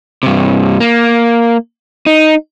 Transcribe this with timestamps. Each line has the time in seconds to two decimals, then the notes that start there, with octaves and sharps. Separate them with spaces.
0.23 G2 C3
0.80 A#3
2.06 D#4